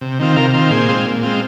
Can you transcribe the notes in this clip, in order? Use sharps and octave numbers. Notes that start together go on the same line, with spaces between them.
C3
D#3 C4 F4
C3 F4 A#4
D#3 C4 F4
A#2 G#4 C5
G#3 C4 F4
A#2
G#3 C4 F4